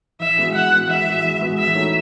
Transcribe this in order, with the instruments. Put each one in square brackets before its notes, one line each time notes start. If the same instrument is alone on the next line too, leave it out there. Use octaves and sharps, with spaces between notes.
[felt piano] E3 [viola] E5
[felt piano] G#3 B3 F#4
[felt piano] E3 [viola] F#5
[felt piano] G#3 B3 F#4
[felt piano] E3 [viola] E5
[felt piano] G#3 B3 F#4
E3
G#3 B3 F#4
[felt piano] E3 [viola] E5
[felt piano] A3 D#4 F#4 C#5